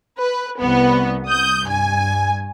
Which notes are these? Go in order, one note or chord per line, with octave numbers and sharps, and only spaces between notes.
B4
C2 B3
D#6 G6
G2 G#5